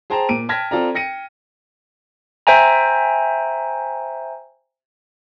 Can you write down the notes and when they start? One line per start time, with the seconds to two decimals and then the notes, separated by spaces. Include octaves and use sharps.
0.10 G#4 C5 G5 A5 A#5
0.29 A#2 D7 D#7
0.49 G5 A5 F6 G#6 A#6 B6
0.71 C4 F4 A4 D5 A#5
0.95 G5 A#6 C#7 D#7
2.47 C5 E5 G5 G#5 A#5